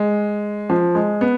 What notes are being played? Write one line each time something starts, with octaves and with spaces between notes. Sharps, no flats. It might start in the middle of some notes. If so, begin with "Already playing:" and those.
Already playing: G#3
F3
G#3
B3